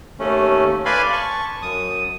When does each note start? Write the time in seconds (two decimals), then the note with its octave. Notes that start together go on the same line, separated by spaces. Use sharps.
0.19 D#2 A3 C#4
0.86 B4 D5 F5 G#5 B5 C6
1.13 A5 C#6
1.62 F#2 D#6